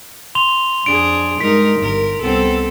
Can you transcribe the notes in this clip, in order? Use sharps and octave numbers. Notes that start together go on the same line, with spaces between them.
C6 F7 G7
F2 D4 G#4 D7
G2 G#3 D#4 A#4 B6
G1 A#4
C2 B3 C4 A4